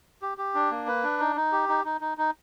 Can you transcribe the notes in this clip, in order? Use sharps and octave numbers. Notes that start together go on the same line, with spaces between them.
G4
G4
D4
A#3
B4
D4
D#4
D#4
G4
D#4
D#4
D#4
D#4